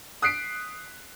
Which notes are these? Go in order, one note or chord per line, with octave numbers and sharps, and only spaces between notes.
D#6 F#6 B6 C7 D7